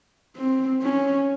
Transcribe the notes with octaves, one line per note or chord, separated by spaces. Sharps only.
C4
C#4